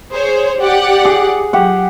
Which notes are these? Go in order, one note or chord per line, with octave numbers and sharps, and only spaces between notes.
G#4 C5 C#5
G4 D5 F#5
G#4
F#3 G4 F#5